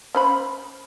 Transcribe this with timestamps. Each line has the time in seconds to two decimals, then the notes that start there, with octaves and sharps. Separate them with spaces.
0.15 C#4 C5 B5